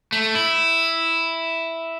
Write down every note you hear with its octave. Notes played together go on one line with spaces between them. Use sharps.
A3
E4